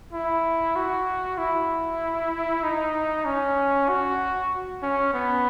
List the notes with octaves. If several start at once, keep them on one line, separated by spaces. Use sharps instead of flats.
E4
F#4
E4
D#4
C#4
F#4
C#4
B3